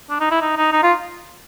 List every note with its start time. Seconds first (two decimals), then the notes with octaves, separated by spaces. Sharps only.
0.10 D4
0.20 D#4
0.31 E4
0.42 D#4
0.57 D#4
0.72 D#4
0.83 F4